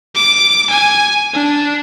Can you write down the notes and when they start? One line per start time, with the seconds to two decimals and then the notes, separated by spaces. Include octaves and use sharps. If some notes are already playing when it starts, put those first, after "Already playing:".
0.15 D6
0.70 G#5
1.33 D4